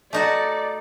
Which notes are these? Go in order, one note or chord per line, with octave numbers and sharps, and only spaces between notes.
A3 D#4 F#4 D5